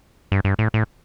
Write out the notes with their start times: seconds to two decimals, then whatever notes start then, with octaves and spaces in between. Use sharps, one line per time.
0.32 G2
0.45 G2
0.59 A2
0.74 A2